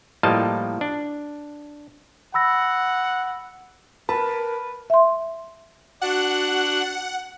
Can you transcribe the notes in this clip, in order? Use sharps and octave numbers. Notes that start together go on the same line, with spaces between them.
A2 F3 G3 A#3 D#5 A5
D4
F#5 B5 E6 A#6
A#4 B4 A5
E5 C6
D4 F#4 F#5 F#6